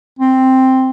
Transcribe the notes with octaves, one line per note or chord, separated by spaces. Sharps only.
C4